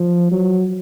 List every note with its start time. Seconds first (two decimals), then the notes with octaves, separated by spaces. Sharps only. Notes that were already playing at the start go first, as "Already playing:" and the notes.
Already playing: F3
0.32 F#3